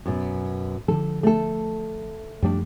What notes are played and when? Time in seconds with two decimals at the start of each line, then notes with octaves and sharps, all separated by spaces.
0.06 F#2 B2
0.88 D3 F3 A4
1.23 A3 A4
2.42 F#2 F3 G3 A3 D4